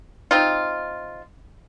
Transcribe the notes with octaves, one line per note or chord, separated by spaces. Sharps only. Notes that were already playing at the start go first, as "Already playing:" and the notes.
C4 D#4 F4